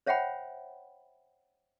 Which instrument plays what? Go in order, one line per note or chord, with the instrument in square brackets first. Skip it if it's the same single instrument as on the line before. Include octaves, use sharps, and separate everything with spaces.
[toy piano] C5 C#5 E5 F#5 G5 B5